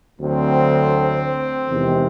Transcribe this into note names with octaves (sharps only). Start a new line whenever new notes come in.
D2 D3 F#3 C4
E2 C3 D#3 G#3